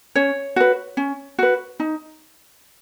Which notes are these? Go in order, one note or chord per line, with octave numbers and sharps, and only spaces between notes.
C#4 C#5
F#4 B4
C#4
F#4 B4
D#4